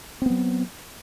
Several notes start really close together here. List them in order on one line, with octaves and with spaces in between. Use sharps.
C4 B3 F#3